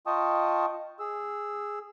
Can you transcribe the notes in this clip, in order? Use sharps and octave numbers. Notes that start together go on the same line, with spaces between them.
F4 D#5 G5 A5 C#6 D#6
G#4 E6